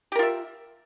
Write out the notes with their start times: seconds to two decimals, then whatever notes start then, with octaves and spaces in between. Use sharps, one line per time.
0.12 G4
0.15 A#4
0.19 F4
0.23 E5